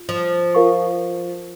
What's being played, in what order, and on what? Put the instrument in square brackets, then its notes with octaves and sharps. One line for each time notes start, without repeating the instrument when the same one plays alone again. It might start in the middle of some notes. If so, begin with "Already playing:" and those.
Already playing: [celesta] F4
[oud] F3
[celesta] F4 A#4 F5 C#6